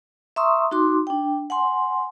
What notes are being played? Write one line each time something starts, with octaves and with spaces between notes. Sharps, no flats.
E5 A#5 C6 C#6 D#6 E6
D#4 F#4 C6 D6
D4 G5
F#5 G#5 C6